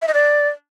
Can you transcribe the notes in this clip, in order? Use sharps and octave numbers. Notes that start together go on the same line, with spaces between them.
E5
D#5
D5